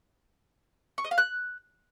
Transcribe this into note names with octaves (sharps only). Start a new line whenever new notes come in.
C#6
D#5
F5
F#6